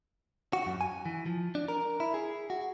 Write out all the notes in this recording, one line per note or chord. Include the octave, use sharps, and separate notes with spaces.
F#4
F#2
G#5
E3
F3
D4
A#4
E4
G#4
F#4